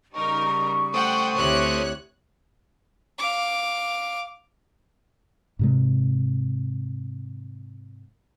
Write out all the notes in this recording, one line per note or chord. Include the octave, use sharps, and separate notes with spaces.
C#3 G3 D#4 A#4 C#6
A3 C5 F#5 G5 D#6
D2 C4 E4 G4 C#5 F#6
F5 D6
G#2 C3 G#3